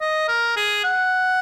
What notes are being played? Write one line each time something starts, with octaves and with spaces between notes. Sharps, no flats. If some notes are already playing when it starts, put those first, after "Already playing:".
D#5
A#4
G#4
F#5